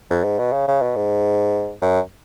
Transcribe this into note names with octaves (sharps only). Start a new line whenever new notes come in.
F2
G#2
B2
C#3
C#3
B2
G#2
F#2